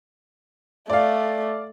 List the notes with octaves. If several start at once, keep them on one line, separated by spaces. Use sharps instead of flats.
A3 D5 F5